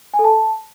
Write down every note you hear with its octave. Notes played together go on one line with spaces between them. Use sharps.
G#5
A4
A5